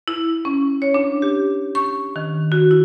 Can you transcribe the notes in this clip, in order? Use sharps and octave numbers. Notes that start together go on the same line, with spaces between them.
E4
C#4
C#5
D4
G4
C#6
D#3
F#4
E4